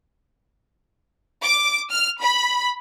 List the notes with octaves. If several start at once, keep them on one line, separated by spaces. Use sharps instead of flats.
D6
F6
B5